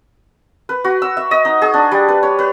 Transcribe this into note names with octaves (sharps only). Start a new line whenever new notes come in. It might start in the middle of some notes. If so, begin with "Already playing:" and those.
B4
F#4
E6
E5
D#5
D#4
G#4
D4
G3
B4
C#5
B4